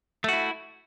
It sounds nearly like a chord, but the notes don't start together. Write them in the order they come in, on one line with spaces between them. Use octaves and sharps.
A3 F#4 E4